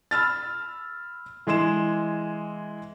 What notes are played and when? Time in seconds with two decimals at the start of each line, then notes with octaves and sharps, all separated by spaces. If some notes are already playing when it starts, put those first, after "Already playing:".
0.11 B5 E6 F6 A6
1.47 E3 G#3 D#5 C6 E7